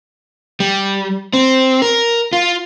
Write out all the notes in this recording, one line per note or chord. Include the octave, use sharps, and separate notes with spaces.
G3
C4
A#4
F4